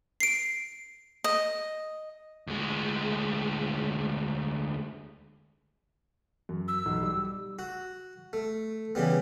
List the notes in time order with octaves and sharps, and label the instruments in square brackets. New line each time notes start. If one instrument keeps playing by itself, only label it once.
[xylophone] C7 D7
[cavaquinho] D#5
[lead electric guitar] D2 G#3
[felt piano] F#2
[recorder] E6
[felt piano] B1
G3
[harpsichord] F#4
A3
C#3 E3 G3 B3